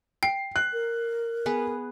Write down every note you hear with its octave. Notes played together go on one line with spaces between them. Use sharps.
G5 C7
F#6
A#4
B3 G#4 B4